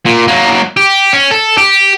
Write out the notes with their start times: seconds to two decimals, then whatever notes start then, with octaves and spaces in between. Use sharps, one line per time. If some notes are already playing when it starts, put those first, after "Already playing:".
0.06 A#2
0.28 F#3 A#3
0.77 G4
1.13 C#4
1.31 A4
1.58 G4